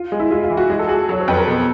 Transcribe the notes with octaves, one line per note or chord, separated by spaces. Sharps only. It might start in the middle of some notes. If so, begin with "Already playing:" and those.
Already playing: F4
G#3
E4
G#3 F4
F4
E3
F#4
G#3 G#4
A4
F#4 G#4
F#3 C#5
C5
F2 B4
A#4
B2 A4